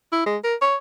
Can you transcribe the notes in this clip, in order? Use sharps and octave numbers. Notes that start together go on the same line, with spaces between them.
E4
G#3
A#4
C#5